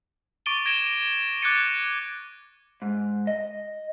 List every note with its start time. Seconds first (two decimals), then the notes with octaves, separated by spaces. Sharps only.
0.46 C#6 D6 A6 D7 D#7 G7
0.66 G#6 A#6 D7 E7 G7
1.42 D6 F#6 G#6 A6 C#7 D#7
2.82 G#2
3.27 D#5